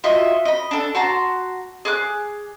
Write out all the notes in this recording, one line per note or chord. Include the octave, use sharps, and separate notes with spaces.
F4 F#4 D#5 E5
D#5 B5
D4 A4
F#4 A5 A#5 C6
G#4 D6 F#6